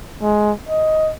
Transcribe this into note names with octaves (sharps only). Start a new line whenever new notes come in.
G#3
D#5